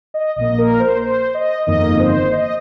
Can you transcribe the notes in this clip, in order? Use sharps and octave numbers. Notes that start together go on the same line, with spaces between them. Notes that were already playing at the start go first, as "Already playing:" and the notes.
D#5
A#1 A#2 A#3 D#5
A#4
C5
C5
D#5
G1 F2 D#3 A#3 D#5
C5
D#5